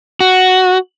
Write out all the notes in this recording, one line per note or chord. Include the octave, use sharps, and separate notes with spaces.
F#4